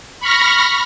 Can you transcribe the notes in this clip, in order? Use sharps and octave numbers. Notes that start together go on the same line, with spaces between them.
B5 C#6 F6 A#6